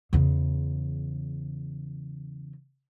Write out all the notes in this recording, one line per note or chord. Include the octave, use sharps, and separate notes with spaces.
E2 C#3